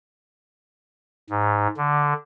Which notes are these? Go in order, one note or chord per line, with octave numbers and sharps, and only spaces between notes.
G#2
D3